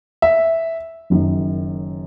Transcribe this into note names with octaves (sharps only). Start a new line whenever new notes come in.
E5
F#1 F#2 D#3